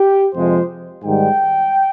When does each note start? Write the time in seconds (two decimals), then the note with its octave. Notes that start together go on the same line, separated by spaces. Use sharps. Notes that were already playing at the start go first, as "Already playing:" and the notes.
Already playing: G4
0.35 F2 C3 F3 G#3 C5
1.04 G#2 D#3 G3 G5